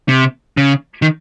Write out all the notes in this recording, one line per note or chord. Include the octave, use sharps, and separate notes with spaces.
C3
C#3
D#3